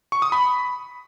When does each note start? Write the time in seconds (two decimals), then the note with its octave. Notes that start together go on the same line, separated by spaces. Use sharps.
0.12 C#6
0.22 D#6
0.32 B5